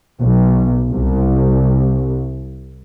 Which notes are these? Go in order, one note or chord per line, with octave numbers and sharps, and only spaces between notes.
B1
C2